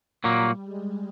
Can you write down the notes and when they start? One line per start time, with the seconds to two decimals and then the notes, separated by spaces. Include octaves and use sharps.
0.24 A#2 F#3 G3 A#3
0.63 G#3